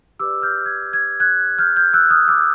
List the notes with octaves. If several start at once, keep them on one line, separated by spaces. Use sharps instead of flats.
G4 B4 D5 D6 E6
F6 G6
G#6
G#6
F#6 G#6
F6 G6
F6 G6
E6 F#6
D#6 F6
D6 E6